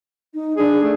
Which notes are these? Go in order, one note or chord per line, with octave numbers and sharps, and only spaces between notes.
D#4
D4 G#4
A3